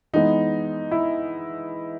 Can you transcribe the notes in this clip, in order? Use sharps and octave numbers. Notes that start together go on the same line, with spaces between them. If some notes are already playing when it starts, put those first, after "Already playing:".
E3 G#3 B3 D#4
E4